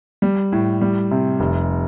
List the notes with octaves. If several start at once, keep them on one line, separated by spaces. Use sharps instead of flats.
G3
A2
G3
C3
F1